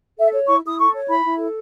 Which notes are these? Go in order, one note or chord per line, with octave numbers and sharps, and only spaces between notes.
A4 E5
C#5
E4 C#6
E4 D#6
A4 C#6
C#5
E4 B5
E4
A4